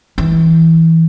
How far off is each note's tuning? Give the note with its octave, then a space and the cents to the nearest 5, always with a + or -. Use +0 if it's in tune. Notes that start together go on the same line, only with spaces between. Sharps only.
E3 -15